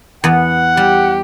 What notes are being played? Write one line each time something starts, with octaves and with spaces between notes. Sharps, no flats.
E2 B3 F#5
G3 G4